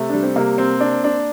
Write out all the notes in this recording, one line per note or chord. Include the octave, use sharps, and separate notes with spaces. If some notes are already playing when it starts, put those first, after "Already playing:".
Already playing: C3 A3
G3 D4
C4
C3 A#3
C4
D4
D4